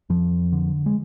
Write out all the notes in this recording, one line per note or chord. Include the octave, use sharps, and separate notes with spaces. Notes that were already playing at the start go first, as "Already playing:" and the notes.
F2 F3
D3
G#3